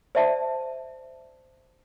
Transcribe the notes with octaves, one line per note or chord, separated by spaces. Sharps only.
C5 D5 E5 A5